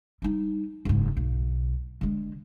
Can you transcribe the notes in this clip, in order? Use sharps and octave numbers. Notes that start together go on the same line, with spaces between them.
G3 D#4
F#1 G#2
B1
D3 G#3